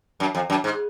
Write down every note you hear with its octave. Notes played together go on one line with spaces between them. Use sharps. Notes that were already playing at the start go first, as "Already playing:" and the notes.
F#2
F2
F#2
G#2